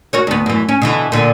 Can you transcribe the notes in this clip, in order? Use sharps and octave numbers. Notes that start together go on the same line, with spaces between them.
F#4 A#4 C#5
D2 B3
F#2 E3
C#4
B2 D3 E3
A#2 D3